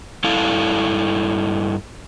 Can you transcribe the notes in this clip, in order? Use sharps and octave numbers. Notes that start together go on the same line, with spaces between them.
G2 E4 A4 F5 A5